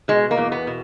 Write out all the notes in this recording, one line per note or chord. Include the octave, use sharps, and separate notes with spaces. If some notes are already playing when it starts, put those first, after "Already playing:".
B2 G#3
A#3
E2
B3
B2